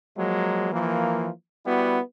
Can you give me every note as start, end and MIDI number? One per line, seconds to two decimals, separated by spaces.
0.16 0.71 53
0.16 0.71 54
0.16 0.71 56
0.16 0.71 58
0.72 1.29 52
0.72 1.29 53
0.72 1.29 58
1.65 1.99 55
1.65 1.99 59
1.65 1.99 64
1.65 1.99 66